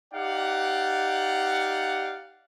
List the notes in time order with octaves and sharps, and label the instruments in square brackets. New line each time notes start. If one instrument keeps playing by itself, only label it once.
[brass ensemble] D#4 G4 D5 F5 F#5